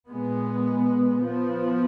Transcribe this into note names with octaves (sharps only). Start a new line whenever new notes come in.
A#2 G#3 B3
F3 B3